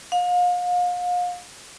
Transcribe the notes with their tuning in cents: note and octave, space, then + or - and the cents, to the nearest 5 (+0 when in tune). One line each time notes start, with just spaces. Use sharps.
F5 +35